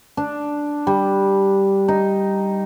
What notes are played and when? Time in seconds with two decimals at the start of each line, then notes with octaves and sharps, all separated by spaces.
0.17 D4
0.87 G3
1.88 D#4